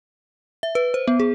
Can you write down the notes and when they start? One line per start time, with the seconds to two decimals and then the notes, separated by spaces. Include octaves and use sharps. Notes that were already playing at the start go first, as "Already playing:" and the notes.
0.63 E5
0.75 B4
0.94 C5
1.08 B3
1.20 G#4